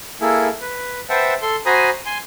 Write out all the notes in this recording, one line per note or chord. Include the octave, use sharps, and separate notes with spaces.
A#3 E4 G#4 A4
B4
B4 C5 E5 F#5 G5 A5
A4 C6
F#4 C5 G#5 A#5 B5 D#6
G#5 C6